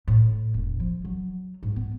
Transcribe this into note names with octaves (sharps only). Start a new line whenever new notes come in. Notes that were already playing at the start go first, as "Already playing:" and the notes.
A2
E1
F3
F#3
G#2
B3